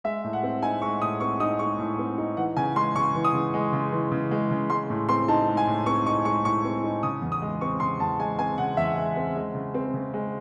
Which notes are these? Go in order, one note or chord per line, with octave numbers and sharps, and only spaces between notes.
G#3 E5
A2
F#5
C4
D#4 G#5
G#3 C#6
A2 D#6
C4 C#6
D#4 D#6
G#3 C#6
A2
C4
D#4
E3 F#5
C#3 G#5
G#3 C6
C#3 C#6
E3
D#6
C#3
G#3
C#3
E3
C#3
G#3
C#3
G#3 C6
A2
C4 C6
D#4 A5
G#3
G#5
A2
C4 C#6
D#4 C#6
G#3 C#6
A2 C#6
C4
D#4
C#3 D#6
E2
D#6
G#3
C4 C#6
C#3 C6
E2 A5
G#3 G#5
C4 G#5
C#3 F#5
E2 E5
G#3
C4
G#3
C#3
C4
C#3
G#3